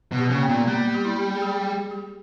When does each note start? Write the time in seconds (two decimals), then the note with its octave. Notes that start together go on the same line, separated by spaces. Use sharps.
0.12 B2
0.19 G4
0.30 C#3 A#3
0.43 B3
0.49 A#2
0.68 G3 A#3
0.94 G4
1.05 E4
1.35 G#4
1.42 G4
1.67 G#4
1.91 G4